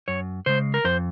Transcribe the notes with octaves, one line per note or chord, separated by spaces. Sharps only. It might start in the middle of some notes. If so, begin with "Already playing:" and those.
F#2 C#5
C#3 G#3 C5
A#4
F2 C5